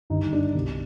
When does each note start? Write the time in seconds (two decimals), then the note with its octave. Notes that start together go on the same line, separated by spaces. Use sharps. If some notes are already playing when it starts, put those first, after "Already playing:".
0.10 G1 G2 D#3 D#4
0.33 D4
0.55 C2 B2